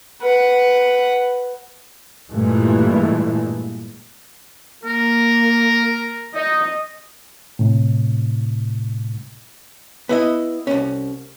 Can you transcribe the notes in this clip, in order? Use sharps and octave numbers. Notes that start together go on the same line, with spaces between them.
B4 F#5
G2 A#2 E3 G#3 A3
A#3 A#4
D#4 D#5
A2 C3
B3 E4 D#5
C2 C#4